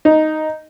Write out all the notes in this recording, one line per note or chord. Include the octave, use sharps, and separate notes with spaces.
D#4